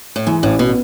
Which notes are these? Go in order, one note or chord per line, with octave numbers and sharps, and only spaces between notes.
A2
G#2 E3
A1 A2
B2